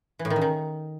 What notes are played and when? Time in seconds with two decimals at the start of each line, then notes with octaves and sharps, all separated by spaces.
0.19 E3
0.25 A2
0.30 D#3
0.36 C#3
0.41 D#3